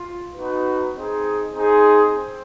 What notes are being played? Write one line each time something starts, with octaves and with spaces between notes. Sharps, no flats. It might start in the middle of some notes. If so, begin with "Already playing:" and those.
Already playing: F4
B3 D#4 F#4 B4
C4 D#4 G#4
C4 D#4 G#4 C5
C4